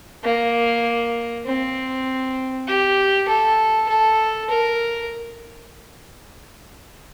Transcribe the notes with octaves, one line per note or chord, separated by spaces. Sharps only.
A#3
C4
G4
A4
A4
A#4